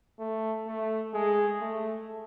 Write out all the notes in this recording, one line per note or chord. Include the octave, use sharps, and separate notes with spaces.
A3
A3
G#3
A3